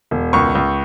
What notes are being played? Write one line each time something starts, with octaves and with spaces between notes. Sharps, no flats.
E1
C#2 C#6
C#2